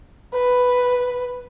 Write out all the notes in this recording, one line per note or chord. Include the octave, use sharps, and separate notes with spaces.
B4